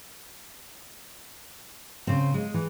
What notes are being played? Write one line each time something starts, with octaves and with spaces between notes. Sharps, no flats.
C#3 C4
G#3
E3